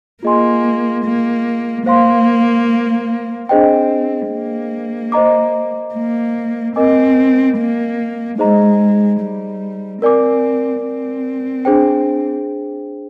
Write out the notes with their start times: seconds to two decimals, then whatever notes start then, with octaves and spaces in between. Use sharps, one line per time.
0.23 A#3 F4 G#4 D#5 G#5 C6
1.05 A#3
1.86 A#3 C5 F5 C6
3.49 C4 D4 G#4 C5 D#5 G5
4.30 A#3
5.12 C5 D#5 A#5 D6
5.94 A#3
6.76 C4 A#4 D#5 G#5 D6
7.57 A#3
8.38 G#3 D#4 G#4 C5 D#5 A#5
9.20 G3
10.02 C4 A#4 D5 G#5 D6
10.84 C4
11.65 D4 G#4 C5 G5